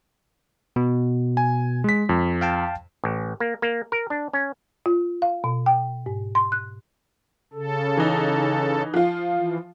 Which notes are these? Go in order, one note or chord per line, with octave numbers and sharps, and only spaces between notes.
B2
G#5
G#3 B6
F2
F5 G5 A5
A1
A#3
A#3
A#4
D4
C#4
F4
F5
B2
G5
G#2
C6
F#6
C#3 A4
E3 D#4
F3 F4
E3